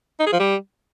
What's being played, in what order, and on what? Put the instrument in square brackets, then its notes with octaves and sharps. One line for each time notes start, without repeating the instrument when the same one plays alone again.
[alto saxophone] D#4
G#4
F3
G3